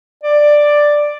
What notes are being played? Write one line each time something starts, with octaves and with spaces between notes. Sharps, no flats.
D5